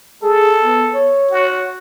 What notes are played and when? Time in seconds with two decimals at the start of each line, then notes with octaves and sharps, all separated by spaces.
0.23 G#4 A4
0.62 B3
0.94 C#5
1.31 F#4